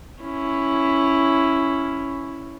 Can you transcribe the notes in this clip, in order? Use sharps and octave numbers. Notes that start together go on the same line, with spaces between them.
C#4 E4